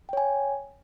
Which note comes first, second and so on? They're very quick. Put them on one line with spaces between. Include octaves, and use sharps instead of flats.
G5 C#5 G#5